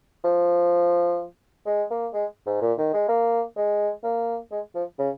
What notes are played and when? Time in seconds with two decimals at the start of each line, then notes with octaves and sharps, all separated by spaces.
0.24 F3
1.66 G#3
1.90 A#3
2.14 G#3
2.46 G#2
2.62 A#2
2.78 D#3
2.93 G#3
3.08 A#3
3.57 G#3
4.04 A#3
4.51 G#3
4.75 F3
4.99 C#3